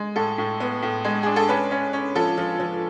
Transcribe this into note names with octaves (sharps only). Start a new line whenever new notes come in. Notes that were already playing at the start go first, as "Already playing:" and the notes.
Already playing: G#3
A2 A4
A2
B3
A2
G#3
D4 G#4
A4
C#4 B4
C#4
C#4
F3 A4
F3
F3